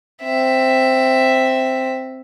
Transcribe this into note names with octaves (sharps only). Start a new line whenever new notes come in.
C4 E5